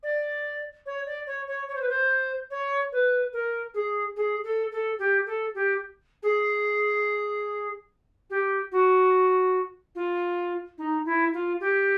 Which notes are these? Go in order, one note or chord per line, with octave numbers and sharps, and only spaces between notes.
D5
C#5
D5
C#5
C#5
C#5
C5
B4
C5
C#5
B4
A#4
G#4
G#4
A4
A4
G4
A4
G4
G#4
G4
F#4
F4
D#4
E4
F4
G4